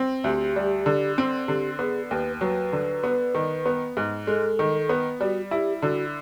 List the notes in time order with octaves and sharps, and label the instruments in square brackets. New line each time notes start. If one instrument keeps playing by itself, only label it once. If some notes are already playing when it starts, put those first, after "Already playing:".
Already playing: [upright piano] C4
[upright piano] D2 [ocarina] G4
[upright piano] G3
D3
C4
[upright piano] D3 [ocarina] G4
[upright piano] B3 [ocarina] G#4
[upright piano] D#2 [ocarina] B4
[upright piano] F#3 [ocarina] B4
[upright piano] D3
B3
D#3
B3
G#2
[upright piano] G#3 [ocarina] A4
[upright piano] D#3
B3
[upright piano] G3 [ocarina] F#4
[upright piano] E4 [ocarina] G4
[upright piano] D3 [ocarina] F#4